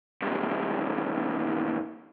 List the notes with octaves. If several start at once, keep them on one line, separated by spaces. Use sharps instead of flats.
B1 G2